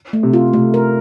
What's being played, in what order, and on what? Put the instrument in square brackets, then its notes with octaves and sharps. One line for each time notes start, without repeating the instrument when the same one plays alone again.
[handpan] A3
[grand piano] C3
[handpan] F4
[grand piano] C3 [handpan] A3
[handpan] A#4